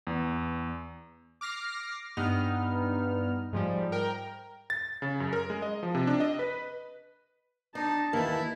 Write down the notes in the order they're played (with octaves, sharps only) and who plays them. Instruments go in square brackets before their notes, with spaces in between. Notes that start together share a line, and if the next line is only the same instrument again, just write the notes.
[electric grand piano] E2
[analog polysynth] D6 F6 A#6 C7
G2 B3 D#4 F6
G#2 F3 G3
A#4 G5
[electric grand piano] A6
C#3
F#2
A#4
G#3
D#5
F3
C3
D4
D#5
B4
[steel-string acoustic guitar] D4 [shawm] D#4 [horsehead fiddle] A5
[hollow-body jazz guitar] D#2 A#3 [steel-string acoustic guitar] D#3 E3 [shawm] E4